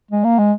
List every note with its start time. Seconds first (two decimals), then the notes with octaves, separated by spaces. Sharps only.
0.11 G#3
0.24 A#3
0.38 G#3